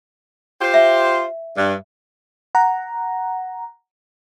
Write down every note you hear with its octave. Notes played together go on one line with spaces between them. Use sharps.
F4 G4 C5
E5
G2
F#5 A#5